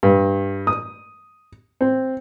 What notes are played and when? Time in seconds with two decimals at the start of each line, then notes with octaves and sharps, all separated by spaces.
0.03 G2
0.67 D#6
1.81 C4